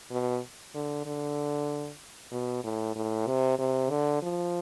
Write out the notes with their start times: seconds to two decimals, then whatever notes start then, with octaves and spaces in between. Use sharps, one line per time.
0.11 B2
0.74 D3
1.05 D3
2.32 B2
2.64 A2
2.96 A2
3.27 C3
3.59 C3
3.90 D3
4.22 F3